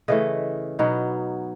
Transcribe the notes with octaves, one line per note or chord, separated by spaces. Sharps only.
C#3 E3 A3 D#5
B2 F#3 B3 D#4